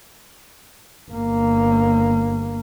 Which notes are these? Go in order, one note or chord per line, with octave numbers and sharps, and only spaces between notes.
G1 A#3